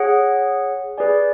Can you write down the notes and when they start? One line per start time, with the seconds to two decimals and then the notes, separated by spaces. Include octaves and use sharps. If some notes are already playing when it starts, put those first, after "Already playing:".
Already playing: G#4 C#5 F#5
0.98 G#4 B4 D5 G#5